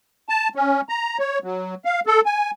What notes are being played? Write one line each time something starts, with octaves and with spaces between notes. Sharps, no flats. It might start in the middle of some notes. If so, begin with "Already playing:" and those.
A5
C#4
A#5
C#5
F#3
F5
A4
G#5